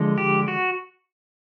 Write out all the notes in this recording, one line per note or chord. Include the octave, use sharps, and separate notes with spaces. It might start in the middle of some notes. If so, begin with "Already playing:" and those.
Already playing: D3 F3 G#3
G4
F#4